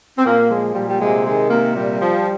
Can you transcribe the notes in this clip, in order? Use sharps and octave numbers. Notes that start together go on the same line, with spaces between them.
C4
A#2 A#3
F3 G#3
A#2 G3
G3
C3 G#3
D#3 G#3
C3 A#3
A#2 G3
F3